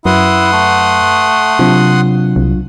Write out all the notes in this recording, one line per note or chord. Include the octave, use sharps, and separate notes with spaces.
F#2 E4 B4 F#5 C6 D#6
A3
C3 F#3 D4 F4
C2